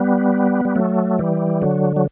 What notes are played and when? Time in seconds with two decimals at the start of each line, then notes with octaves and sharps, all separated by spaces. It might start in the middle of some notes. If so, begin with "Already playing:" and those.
Already playing: G3 B3
0.65 G3
0.76 F#3 A3
1.19 E3 G3
1.62 D3 F#3
1.96 F#3